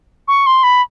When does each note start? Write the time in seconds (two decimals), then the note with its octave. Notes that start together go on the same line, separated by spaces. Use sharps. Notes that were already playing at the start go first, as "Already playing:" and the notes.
0.28 C#6
0.46 C6
0.63 B5